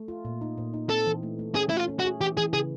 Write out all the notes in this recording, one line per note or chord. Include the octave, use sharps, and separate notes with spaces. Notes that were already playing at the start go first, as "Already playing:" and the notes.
Already playing: A3
F4
A#2
D#4
A#2
D#4
C4 A4
E3
A3
A3
C#4 G#4
A3 E4
F4
C#4
F#4
G#4
E3 G4
E3 G#4
C#3 G#4